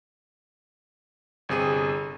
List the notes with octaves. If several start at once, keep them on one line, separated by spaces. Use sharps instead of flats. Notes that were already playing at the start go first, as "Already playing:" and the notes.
G1 C3 G#4 D#7